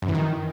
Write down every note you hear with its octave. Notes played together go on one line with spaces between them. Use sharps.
F#2
E3
D#3